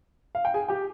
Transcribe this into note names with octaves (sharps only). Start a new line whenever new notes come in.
F5
G5
G#4 G#5
G4 G5